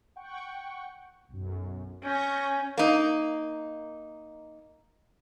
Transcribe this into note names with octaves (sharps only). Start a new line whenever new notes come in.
F#5 G5 C#6
B1 F#2
C#4 C#6 G6 A#6
A#3 D#4